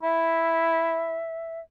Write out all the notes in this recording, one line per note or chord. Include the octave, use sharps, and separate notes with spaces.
E4 E5